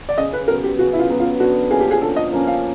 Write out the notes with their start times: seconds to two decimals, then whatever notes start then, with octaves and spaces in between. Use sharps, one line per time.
0.09 D5
0.18 C#3 D#5
0.33 B4
0.48 F#3 B3 A#4
0.64 G4
0.79 C#3 F#4
0.93 E4
0.99 F4
1.09 F#3 B3
1.20 F4
1.40 D3 F#4
1.70 F3 A#3 C#4 G#4
1.81 G4
1.91 G#4
2.01 D3 A4
2.16 D#5
2.32 F3 A#3 C#4
2.47 F5